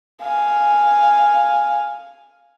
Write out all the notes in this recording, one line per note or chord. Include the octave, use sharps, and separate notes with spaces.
F5 G#5